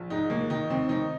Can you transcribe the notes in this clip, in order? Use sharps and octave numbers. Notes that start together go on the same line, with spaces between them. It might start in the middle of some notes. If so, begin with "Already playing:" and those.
Already playing: A#1
G#2 D#4
D#2 A#3
D#3 D#4
D#2 C4
D#2 D#4